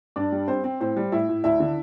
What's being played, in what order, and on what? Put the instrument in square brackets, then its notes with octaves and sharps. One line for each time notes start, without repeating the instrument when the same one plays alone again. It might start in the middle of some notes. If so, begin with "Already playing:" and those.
[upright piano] G2 D4 D5
G3
C4 C5
C4
A2 C5
G3
A2 E4 E5
A2
D2 E4 E5
D3